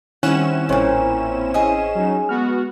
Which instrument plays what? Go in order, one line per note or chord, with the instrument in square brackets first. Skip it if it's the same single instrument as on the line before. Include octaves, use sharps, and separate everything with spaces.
[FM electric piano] D#3 G3 [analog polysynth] C4 E4 [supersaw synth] C#4 E7 [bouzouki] F#5
[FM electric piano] A1 C5 C#5 [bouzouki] A#2 C#3
[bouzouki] G#4 D#5
[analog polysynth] F#3 D#4
[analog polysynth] G#3 B3 F#4 [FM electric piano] F6